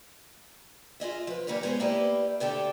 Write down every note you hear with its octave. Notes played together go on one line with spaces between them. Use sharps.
F4 G#4 D#5 E5
F3 B4
E3 G3 A#3 A#4 B4 C#5
G#3 B3 G#4 A#4 C5 C#5
A#3 E4 G4 B4 D5 D#5
D2 D3 G4 A4 G5